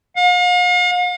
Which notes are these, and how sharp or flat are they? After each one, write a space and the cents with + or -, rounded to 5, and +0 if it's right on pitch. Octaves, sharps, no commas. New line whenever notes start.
F5 +45